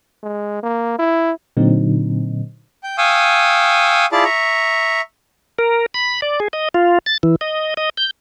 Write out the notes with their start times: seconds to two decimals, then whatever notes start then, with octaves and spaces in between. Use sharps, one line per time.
0.23 G#3
0.63 A#3
0.99 E4
1.57 A#2 D3 F#3 C4 D#4
2.83 G5
2.98 F5 G5 G#5 C#6 D#6 E6
4.12 E4 F4 G#4 D5 A5
4.24 E5 A#5 C#6
5.59 A#4
5.94 B5
6.22 D5
6.40 G#4
6.53 D#5
6.74 F4
7.06 A6
7.23 E3
7.41 D#5
7.77 D#5
7.97 G6